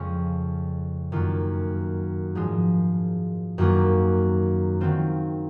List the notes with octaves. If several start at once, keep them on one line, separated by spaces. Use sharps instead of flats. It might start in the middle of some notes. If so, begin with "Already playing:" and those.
Already playing: F2 C#3 G#3 C#4 F4
F#2 D#3 A#3 F4
G#2 F3 G#3
F#2 D#3 F#3 A#3 F4
D#3 F#3 C4 F4